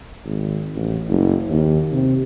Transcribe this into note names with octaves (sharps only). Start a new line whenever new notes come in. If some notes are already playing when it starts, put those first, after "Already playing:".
G#1
A1
F#1
D#2
C3